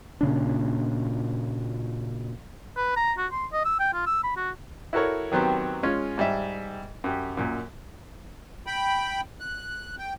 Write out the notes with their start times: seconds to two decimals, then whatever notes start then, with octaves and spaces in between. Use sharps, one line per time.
0.21 A#2 C#3 D4
2.76 B4
2.96 A#5
3.18 F#4
3.32 C6
3.53 D#5
3.65 E6
3.80 G5
3.93 F4
4.07 E6
4.23 B5
4.36 F#4
4.93 E4 F#4 A4 A#4 C#5
5.32 D#3 F#3 B3 C4 G4
5.83 G#3 C#4 F4
6.18 G#2 G3 D#5 E5
7.04 F#2 G4
7.37 F#2 A#2
8.67 G5 B5
9.40 F#6
9.98 G5